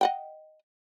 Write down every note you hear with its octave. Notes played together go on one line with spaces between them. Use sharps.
D#5 F#5 G5